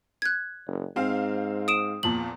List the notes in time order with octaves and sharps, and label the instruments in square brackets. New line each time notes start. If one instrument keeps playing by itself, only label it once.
[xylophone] F#6 G#6
[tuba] F#1
[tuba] G#2 [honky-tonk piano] C4 F5
[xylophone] D#6 D7 E7
[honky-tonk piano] E2 A#2 F3 [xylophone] F#7